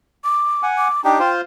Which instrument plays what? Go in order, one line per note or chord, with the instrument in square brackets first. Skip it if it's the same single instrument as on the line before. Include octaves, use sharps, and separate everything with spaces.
[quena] D6
[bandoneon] F#5 G#5
[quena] D6
[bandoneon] D4 D#4 G4 [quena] G5
[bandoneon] F4 C5